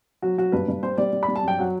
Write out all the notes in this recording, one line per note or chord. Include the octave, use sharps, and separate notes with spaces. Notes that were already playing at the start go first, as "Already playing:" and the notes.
F#3 F#4
F#3 F#4
G2 B4
G2
G3 C5
G3 D5
G3
B5
G3
A5
F#2 G5
F#3 F#5